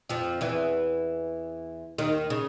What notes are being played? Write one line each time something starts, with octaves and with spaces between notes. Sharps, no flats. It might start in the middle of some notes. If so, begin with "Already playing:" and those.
F2 F3
E2 E3
D#2 D#3
C#3